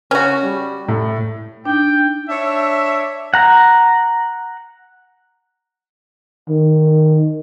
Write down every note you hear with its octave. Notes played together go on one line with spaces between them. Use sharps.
C#3 C#4 F#4
G3
A2 A3
D4 D#4 G5
D4 C#5 D5 E5
F#5 A#5
D#3